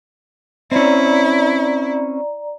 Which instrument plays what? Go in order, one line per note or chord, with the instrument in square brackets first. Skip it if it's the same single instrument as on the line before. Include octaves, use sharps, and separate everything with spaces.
[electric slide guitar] C4 C#4 [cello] E4 [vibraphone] D5 A#5